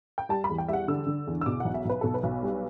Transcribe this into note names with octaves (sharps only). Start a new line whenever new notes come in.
G5
G3 A5
B5
E2
G5
G3 E5 F#5
D3 E6
D3
E2
E6
B2 D6
B1 F#5
E5
B1 B4
B2 A4
B4
B1
G3